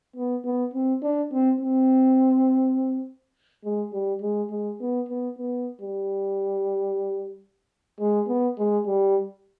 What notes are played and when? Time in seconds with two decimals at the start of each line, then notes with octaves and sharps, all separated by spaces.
0.16 B3
0.45 B3
0.74 C4
1.02 D4
1.32 C4
1.61 C4
3.64 G#3
3.93 G3
4.22 G#3
4.51 G#3
4.81 B3
5.09 B3
5.38 B3
5.82 G3
8.00 G#3
8.28 B3
8.58 G#3
8.87 G3